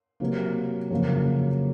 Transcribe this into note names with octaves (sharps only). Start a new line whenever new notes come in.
C3 F#3 A#3
F2 C#3 F#3 A#3 C#4